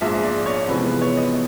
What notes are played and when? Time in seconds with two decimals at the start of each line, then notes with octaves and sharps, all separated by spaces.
0.01 A#1 G#2 F3 E5
0.24 D5
0.46 C#5
0.68 F2 C3 E3 G#3 B3 B4
0.85 B4
1.02 C#5
1.17 D#5